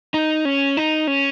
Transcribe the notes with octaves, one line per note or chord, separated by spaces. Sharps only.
D#4
C#4
D#4
C#4